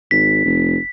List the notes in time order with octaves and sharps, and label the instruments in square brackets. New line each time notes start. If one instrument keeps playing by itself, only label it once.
[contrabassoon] G#1 [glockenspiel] B6
[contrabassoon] F1